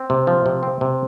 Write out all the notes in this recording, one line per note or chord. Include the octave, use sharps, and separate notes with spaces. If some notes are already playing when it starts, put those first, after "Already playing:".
Already playing: C4
C3
F3
C3
C4
C3